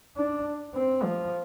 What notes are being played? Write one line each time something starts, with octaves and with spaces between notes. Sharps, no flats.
D4
C4
F3